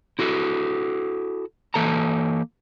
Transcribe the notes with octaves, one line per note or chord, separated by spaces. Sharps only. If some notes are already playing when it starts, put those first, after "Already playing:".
E4 F#4 A4
E3 A#3 A4 A5 A#5